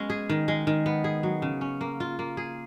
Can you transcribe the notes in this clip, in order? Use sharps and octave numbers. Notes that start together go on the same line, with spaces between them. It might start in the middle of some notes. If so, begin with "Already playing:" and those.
Already playing: G#3 B3 C#4
G#4
D#3
G#3
D#3
B3
G#4
F#3
C#3
C#4
A#3
F4
A#3
G#4